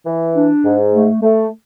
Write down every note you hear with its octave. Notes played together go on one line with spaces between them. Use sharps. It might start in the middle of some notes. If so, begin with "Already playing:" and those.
E3
D4
G#2
A3
A3